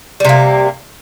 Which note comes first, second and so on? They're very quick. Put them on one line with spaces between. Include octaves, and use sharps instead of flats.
G3 C3 A#3